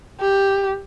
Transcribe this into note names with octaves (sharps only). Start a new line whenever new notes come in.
G4